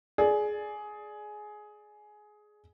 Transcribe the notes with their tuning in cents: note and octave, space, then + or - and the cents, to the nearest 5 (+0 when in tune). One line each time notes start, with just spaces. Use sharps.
G#4 +15 D5 +0